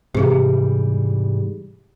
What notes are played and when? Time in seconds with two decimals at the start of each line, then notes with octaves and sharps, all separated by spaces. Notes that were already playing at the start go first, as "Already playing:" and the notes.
0.15 G#2 C3 E3 G3 G4 G#4